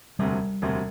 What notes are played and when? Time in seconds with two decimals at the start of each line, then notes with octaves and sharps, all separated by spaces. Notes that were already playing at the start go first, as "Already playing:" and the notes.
0.19 E1 D2 C3 G3
0.62 E1 D2 C3